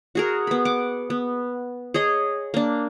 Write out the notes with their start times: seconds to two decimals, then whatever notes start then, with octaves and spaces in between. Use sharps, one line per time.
0.15 F#4 G#4 A#4
0.47 B3 B5
0.65 F#5 D6
1.10 B3
1.94 G#4 C#5 D#5
2.54 A#3 D4